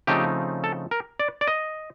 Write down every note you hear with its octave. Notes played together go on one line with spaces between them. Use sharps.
C#3 F3 A3 C4 D#4 G4
A4
A#4
D5
D5
D#5